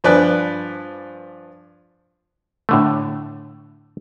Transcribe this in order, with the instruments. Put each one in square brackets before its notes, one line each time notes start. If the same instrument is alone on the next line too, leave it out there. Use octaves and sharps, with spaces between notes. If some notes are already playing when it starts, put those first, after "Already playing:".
[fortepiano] G2 F3 B4 D5 G#5 F#6
[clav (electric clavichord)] A2 D3 A3